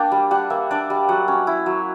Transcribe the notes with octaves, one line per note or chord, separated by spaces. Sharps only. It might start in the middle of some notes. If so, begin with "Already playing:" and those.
Already playing: A#3 D4 G5
G3
G3 F#5
A#3 E5
D4 D5
G3
F#3 F#5
C#4
E4
F#3